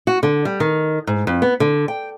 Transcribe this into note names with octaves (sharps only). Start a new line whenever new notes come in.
F#4
D3
G3
D#3
G#2
F2
B3
D3
G5